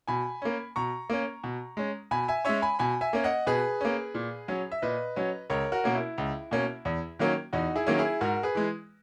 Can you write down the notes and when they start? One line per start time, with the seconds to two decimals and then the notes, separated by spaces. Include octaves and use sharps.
0.07 B2 G#5 B5
0.42 A#3 C#4
0.76 B2 A#5 C#6
1.10 A#3 C#4
1.44 B2
1.77 G#3 C#4
2.11 B2 G#5 B5
2.28 E5 G#5
2.45 G#3 C#4 C#5 E5
2.62 G#5 B5
2.79 B2 G#5 B5
3.01 E5 G#5
3.13 A#3 C#4
3.24 D#5 F#5
3.47 B2 G#4 B4
3.81 A#3 C#4
4.14 A#2
4.48 F#3 C#4
4.72 E5
4.82 A#2 B4 D#5
5.16 F#3 C#4
5.50 C#2 A#4 C#5
5.72 F#4 A#4
5.84 B2 A#3 C#4
5.95 E4
6.18 C#2
6.51 B2 A#3 C#4
6.85 E2
7.19 D#3 F#3 A#3 C#4
7.53 E2 D#4 F#4
7.76 E4 G#4
7.87 D#3 F#3 A#3 C#4
7.98 E4 G#4
8.21 G#2 F#4 A#4
8.43 G#4 B4
8.55 E3 G#3